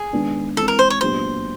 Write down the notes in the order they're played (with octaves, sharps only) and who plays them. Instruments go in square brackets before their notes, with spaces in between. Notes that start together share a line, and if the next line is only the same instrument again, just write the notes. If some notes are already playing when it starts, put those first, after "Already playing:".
Already playing: [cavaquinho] G#4
[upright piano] D#3 G#3 B3 D4
[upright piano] E3 G#3 C4 [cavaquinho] A4
[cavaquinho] A#4
C5
C#5
[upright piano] A#2 F#3 B3 D4 G4 [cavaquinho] C5